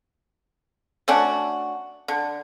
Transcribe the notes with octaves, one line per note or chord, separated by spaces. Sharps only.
A3 C#4 D4 F#4
D3